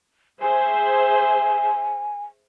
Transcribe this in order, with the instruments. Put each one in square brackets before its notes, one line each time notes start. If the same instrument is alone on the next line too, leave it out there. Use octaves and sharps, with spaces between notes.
[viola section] G#4 C5 E5 [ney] G#5